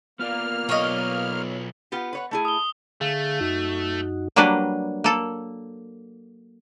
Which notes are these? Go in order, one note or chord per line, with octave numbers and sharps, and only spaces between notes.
A#3 B3 F4 D5 F6
B1 C#5 D#5
B3 F4 G4
B4 C#5 F#5
A3 E4 G#4
D#6 G7
D3 A3 G#4 F5
F#2 D#4 F#4
F#3 G3 A#3 D4 B4
A#3 A4